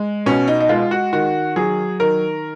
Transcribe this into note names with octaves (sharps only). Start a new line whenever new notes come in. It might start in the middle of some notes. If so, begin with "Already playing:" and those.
Already playing: G#3
B2 C#4
D#4
D#4
G#3 F4
F#4
D#3 F#4
F#3 G#4
D#3 A#4